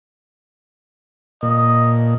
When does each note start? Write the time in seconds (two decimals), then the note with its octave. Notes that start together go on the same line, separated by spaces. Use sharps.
1.43 A#2 D#5